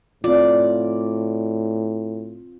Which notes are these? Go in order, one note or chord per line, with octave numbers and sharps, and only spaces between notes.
A2 C4 F4 D5